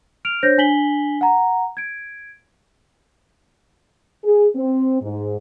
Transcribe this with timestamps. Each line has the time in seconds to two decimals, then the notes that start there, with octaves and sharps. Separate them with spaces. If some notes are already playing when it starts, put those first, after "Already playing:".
0.25 F6 D7 F7
0.43 D4 C5 C#5 G6 A#6
0.58 D4 G#5 B6 F#7 G7
1.21 F#5 A#5
1.77 G#6 D7
4.24 G#4
4.56 C4
5.02 G#2